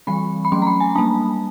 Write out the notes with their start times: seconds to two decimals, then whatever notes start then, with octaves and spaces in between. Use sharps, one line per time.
0.07 E3 G3 C4 B5
0.45 B5
0.52 F#3 A3 C#4 C6
0.62 A#5
0.67 B5
0.80 G#5
0.95 G3 A#3 D4 A5